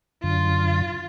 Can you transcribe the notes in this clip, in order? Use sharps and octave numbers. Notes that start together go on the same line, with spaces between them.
F#2 D3 F4